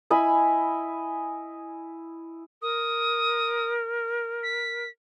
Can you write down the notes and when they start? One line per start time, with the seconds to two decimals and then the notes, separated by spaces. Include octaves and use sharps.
0.10 E4 D#5 G#5 B5
2.62 A#4 D#6
4.43 B6